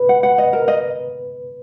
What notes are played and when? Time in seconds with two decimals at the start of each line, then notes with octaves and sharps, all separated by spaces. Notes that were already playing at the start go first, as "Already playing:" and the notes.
Already playing: B4
0.09 F#5
0.23 F#5
0.38 D#5
0.53 A#4
0.68 D#5